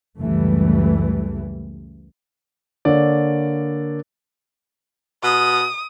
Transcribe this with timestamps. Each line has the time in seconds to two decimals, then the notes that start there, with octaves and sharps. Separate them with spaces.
0.19 C#2 F#2 E3 G3 A3
2.85 D3 A#3 C#5 D5
5.23 B2 D#6